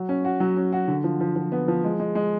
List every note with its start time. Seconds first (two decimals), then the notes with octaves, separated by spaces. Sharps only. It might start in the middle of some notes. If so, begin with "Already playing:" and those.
Already playing: F#3
0.09 C#4
0.25 F#4
0.40 F#3
0.57 C#4
0.73 F#4
0.88 D3
1.04 F3
1.20 F3
1.36 F3
1.52 B3
1.68 F3
1.84 G#3
2.00 G#3
2.15 G#3